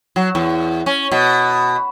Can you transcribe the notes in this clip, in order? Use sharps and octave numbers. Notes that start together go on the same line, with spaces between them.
F#3
E2
C#4
B2